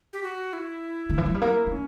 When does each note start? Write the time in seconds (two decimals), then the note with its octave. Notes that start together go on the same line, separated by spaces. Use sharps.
0.13 G4
0.23 F#4
0.53 E4
1.09 D3
1.18 E3
1.26 F#3
1.34 G3
1.42 A#3 E4
1.67 A#3
1.72 C#4